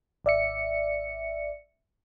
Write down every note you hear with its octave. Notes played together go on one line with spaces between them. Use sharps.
G#1 D5 E5 C#7